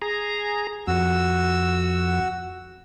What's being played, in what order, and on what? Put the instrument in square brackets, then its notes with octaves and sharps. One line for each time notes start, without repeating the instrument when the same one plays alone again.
[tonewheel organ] G#4 A#5
[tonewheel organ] F2 [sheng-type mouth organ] F#4 E6